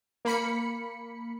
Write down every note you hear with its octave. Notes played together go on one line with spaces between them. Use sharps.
A#3 B5 C#7